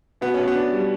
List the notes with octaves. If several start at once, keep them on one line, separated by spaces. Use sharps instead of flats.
B2 B3
B2 C#4
B3
D4
G3